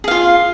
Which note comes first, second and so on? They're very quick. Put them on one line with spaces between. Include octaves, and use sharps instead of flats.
G#4 F5 F4